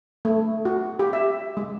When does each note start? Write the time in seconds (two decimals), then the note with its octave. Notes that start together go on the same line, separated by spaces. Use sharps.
0.25 A3
0.65 F#4
0.99 G4
1.13 E5
1.57 G#3